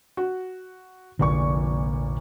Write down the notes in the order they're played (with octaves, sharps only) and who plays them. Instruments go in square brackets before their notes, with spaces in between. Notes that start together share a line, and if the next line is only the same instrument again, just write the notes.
[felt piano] F#4
[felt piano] F1 A#2 C#6 [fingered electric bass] A#1 D3